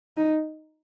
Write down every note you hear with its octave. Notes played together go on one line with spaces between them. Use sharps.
D#4